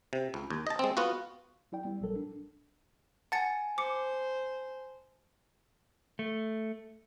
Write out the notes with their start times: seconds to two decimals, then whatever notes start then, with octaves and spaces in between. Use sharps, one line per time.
0.13 C3
0.34 C#2
0.50 D#2
0.67 D#5 A5
0.79 G#3 C4
0.97 B3 F4 F#4
1.72 F#3 E4 D5 G5
1.85 G3 B3
2.01 A#1 F#3 G3 A4 A#4
2.16 D4
3.32 F#5 G#5 A5 A6 C#7
3.78 C5 D6 C#7
6.19 A3